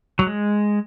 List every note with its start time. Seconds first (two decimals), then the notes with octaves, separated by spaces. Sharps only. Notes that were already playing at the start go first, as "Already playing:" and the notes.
0.19 F#3
0.27 G#3